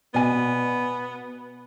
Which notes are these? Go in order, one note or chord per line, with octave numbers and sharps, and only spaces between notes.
B2 B3 D5 G#5